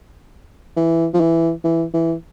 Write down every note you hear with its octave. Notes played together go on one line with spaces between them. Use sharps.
E3
F3
E3
E3
E3